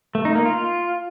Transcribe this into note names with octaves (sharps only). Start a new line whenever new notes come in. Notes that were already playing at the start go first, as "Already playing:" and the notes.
A3
D#4
A#3
F4